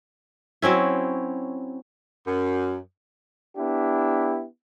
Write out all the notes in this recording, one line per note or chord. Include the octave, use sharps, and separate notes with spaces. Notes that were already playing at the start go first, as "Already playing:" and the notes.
F#3 C4 C#4 E4
F#2
B3 D4 E4 G4